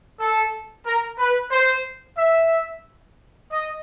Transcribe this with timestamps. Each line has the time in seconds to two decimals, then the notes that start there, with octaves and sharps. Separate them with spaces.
0.20 A4
0.86 A#4
1.18 B4
1.51 C5
2.17 E5
3.50 D#5